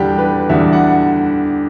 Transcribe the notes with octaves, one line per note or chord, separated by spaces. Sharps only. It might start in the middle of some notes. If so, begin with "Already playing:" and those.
Already playing: E2 D3 G3 D4 G4
B4
E2 D3 G3 E5
F#5